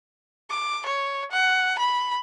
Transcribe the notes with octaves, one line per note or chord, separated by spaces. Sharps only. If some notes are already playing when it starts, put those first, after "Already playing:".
D6
C#5
F#5
B5